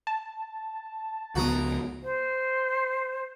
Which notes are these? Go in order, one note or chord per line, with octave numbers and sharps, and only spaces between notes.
A5
C#2 F3 B3 F#4 A#5 D#6
C5